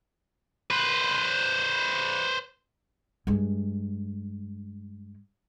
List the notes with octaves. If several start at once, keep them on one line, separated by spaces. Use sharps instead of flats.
B4 C5
G2 G#3